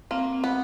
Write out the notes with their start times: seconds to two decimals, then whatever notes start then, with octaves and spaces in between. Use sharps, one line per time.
0.11 A#3 C4
0.33 C4
0.44 B3